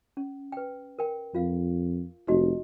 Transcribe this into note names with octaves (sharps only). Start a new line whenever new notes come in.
C#4
B4 G5
A#4 G5
F2 F4 F5
F1 D#4 F#4 D#5